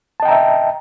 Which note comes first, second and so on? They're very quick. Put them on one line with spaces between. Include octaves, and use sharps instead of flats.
A5 D#5 G5 A#5 E5